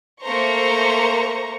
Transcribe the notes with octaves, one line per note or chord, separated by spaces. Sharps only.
A3 A#3 A#4 C5 A#5 C#6